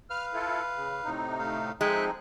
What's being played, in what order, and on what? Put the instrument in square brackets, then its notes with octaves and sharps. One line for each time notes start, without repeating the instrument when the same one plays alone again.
[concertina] B4 F5 [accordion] F6
[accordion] E4 F4 A4
C#3
A2 C3 D#4
[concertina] A3 F5
[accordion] F3 C4 D#4 [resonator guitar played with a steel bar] G#3 [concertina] E5 G5 F#6